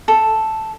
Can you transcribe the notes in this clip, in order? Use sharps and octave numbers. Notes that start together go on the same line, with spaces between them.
A4